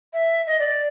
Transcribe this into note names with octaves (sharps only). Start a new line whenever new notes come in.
E5
D#5
D5